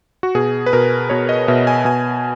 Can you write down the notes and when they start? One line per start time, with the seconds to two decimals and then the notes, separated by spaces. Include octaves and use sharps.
0.23 F#4
0.35 B2 G#4
0.66 B4
0.73 B2 A#4
1.10 B2 C#5
1.29 D#5
1.48 B2 E5
1.67 G#5
1.85 B2 G#5